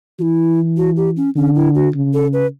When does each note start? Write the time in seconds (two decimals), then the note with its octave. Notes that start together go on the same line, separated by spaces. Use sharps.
0.19 E3 E4 F#4
0.77 F#4
0.97 G4
1.17 C#4
1.35 D3 C#4
1.56 E4
1.75 F#4
1.94 C#3
2.14 A4
2.33 B4